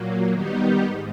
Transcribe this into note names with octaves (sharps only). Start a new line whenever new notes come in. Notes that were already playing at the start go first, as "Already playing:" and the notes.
Already playing: A#2 F#3 A#3
D#3 G3 B3 D#4 G4
G#2